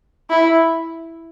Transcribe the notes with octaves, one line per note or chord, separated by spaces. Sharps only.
E4